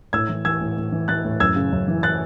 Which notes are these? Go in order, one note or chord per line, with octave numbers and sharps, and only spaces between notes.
A2 E6 G#6
E3
E3 E6 G#6
A2
A2
E3
E3 F#6 A6
A2
F#2 E6 G#6
C#3
F#2
E3
F#6 A6